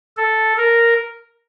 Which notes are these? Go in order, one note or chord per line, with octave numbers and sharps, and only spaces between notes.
A4
A#4